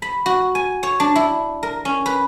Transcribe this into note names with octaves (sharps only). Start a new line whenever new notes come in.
B5
F#4
G#5
C#5
D4
E4
A#4
C#4
B4